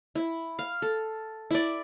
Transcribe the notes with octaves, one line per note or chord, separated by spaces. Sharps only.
E4
F5
A4
E4 D5